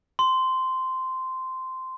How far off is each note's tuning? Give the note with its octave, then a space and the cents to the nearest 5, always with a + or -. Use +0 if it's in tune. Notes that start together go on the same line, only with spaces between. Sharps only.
C6 -10